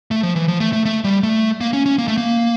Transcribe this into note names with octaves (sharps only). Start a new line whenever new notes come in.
A3
F3
E3
F3
A3
A3
A3
G3
A3
A#3
C#4
C#4
A#3
A3
A#3